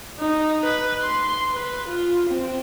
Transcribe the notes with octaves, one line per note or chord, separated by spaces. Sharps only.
D#4
B4
C6
B4
F4
C4